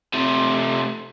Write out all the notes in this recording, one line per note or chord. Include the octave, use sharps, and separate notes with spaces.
C3 A3